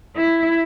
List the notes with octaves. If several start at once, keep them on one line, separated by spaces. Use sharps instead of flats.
E4